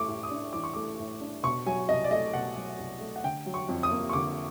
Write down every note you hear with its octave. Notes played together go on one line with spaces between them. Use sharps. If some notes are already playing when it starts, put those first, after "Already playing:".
Already playing: E3 A3 C#6 D6
A2
D#6
D4
E3 D6
C#6
A3 D6
A2
D4
B2 C#6
F#3 G#5
C2 D#5
D5
A3 D#5
B2 F#5
F#3
C2
A3
F#5
D3 G5
F#3
C#6
F2
D#6
A#3
C#6
D3 D6